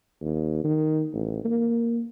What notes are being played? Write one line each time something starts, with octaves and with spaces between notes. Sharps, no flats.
D#2
D#3
A1
A#3